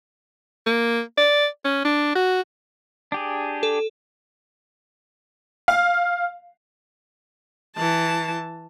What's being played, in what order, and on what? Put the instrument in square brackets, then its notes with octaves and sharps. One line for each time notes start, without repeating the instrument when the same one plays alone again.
[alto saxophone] A#3
D5
C#4
D4
F#4
[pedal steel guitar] D4 G4 G#4
[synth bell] A4
[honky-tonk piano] F5
[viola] E3 A5